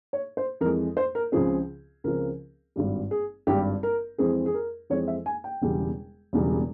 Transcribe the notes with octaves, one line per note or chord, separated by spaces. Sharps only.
C#5
C5
F2 E3 G#3 A#4
C5
A#4
C#2 C#3 F3 C4 G#4
C#2 C#3 F3 C4 A#4
G#1 G2 G3
G#4
G#1 G2 G3 G4
A#4
F2 E3 G#3 C4 G#4
G#4
A#4
F2 E3 G#3 C4 C#5
E5
G#5
G5
E1 E2 C#3 G3
E1 E2 C#3 G3